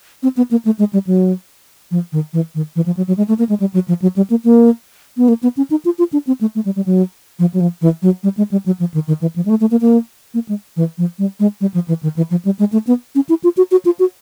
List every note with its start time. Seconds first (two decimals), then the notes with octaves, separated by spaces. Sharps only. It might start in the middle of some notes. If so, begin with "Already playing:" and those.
0.23 C4
0.37 B3
0.51 A#3
0.65 A3
0.79 G#3
0.93 G3
1.07 F#3
1.91 F3
2.12 D#3
2.33 E3
2.55 D#3
2.76 E3
2.86 F3
2.97 F#3
3.07 F#3
3.17 G#3
3.28 A3
3.39 A#3
3.49 G#3
3.60 G3
3.74 F#3
3.88 F3
4.02 F#3
4.16 G3
4.30 A#3
4.44 A#3
5.17 B3
5.28 A#3
5.43 B3
5.57 C#4
5.71 D#4
5.85 F4
5.98 F4
6.13 D4
6.27 C4
6.41 A3
6.55 A3
6.65 G3
6.76 G3
6.86 F#3
7.39 F3
7.54 F#3
7.60 F3
7.82 E3
8.02 F#3
8.23 G3
8.37 G#3
8.51 G3
8.66 F#3
8.80 F3
8.94 D#3
9.07 D#3
9.21 E3
9.36 F3
9.46 G#3
9.50 A3
9.61 A3
9.71 A#3
9.81 A#3
10.34 A#3
10.49 G#3
10.76 E3
10.98 F3
11.19 G3
11.40 G#3
11.61 G3
11.74 F3
11.88 E3
12.03 D#3
12.17 E3
12.31 F3
12.45 G3
12.59 G#3
12.72 A3
12.87 B3
13.15 C#4
13.29 E4
13.44 F4
13.57 F#4
13.71 F#4
13.85 F4
13.99 F#4